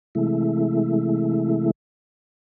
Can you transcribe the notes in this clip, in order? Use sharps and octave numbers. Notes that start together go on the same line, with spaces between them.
C3 E3 G#3 A3 E4